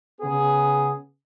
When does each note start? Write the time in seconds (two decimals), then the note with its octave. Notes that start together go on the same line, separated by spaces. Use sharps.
0.21 C#3 B3 G#4